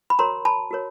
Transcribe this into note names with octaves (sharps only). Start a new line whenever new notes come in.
B5
F#4 A#4 C#5 A#5 C6
A5 B5
F#4 A#4 C#5